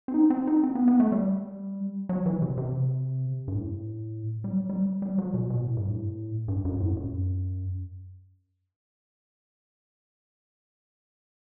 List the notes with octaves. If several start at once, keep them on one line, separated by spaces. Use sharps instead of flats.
C4
D#4
C4
D#4
C4
B3
B3
A3
G3
F#3
E3
C3
C3
G2
A2
G3
F#3
G3
G3
F#3
B2
B2
A2
G2
A2
G2
F#2
A2
F#2